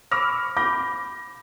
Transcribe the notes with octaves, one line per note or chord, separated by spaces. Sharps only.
B5 C#6 D6 E6 F6 A#6
B5 D6 G6 A#6